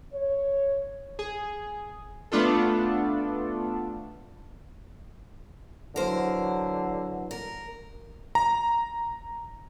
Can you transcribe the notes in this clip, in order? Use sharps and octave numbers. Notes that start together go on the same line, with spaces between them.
C#5
G#4
A3 B3 D4 F4 A4
D3 E3 F#3 A#4 C5
A#4
A#5